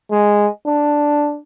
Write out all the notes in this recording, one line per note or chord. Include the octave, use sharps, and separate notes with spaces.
G#3
D4